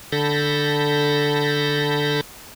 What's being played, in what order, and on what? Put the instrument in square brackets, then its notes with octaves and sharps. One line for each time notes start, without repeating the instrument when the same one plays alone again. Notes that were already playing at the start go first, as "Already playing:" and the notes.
[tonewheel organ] D3 A4 A5 B5 G6 A#6